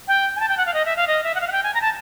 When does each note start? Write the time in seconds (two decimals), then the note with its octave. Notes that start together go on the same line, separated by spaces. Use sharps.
0.08 G5
0.36 G#5
0.40 A5
0.49 G5
0.58 F#5
0.66 F5
0.74 D#5
0.85 E5
0.96 F5
1.08 D#5
1.23 E5
1.35 F#5
1.41 F5
1.48 F#5
1.52 G5
1.63 G#5
1.74 A#5
1.81 A5